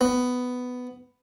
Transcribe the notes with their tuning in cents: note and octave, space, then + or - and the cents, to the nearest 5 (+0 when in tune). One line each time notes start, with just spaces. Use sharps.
B3 +10